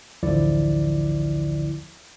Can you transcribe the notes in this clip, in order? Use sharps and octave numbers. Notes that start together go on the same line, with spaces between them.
A1 D2 D3 F3 E4 D5